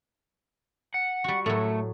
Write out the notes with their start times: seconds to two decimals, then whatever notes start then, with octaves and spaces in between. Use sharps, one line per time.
0.94 F#5
1.24 G3 F#4
1.46 A2 F#3 A3